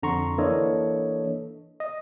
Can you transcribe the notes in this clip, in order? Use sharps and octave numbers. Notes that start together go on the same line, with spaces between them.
F2 D3 A#5 C6 C#6
E3 A#3 D4 A4 C#5 D#5
D#5